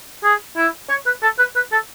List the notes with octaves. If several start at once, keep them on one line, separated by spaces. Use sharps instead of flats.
G#4
E4
C#5
B4
A4
B4
B4
A4